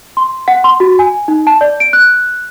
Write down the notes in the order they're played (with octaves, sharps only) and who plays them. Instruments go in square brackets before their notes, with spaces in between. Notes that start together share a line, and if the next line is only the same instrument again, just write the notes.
[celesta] C6
F#5
C6
F#4
G#5
D#4
A5
D5
D7
F#6